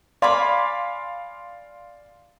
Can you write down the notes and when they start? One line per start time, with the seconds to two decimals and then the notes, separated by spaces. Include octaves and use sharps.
0.22 D5 F5 G#5 B5 C6 D6